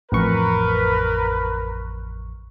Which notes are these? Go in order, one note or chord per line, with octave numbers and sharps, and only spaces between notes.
A1 F2 A#4 B4 C#6